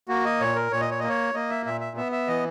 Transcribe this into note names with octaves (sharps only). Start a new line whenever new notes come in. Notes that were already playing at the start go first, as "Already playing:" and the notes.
A#3 F#4
D#5
A#2 C#5
A#4
A#2 C#5
D#5
C#5
A#3 D#5
C#5
A#3 D#5
E5
A#2 E5
E5
B3 E5
E5
E3 D#5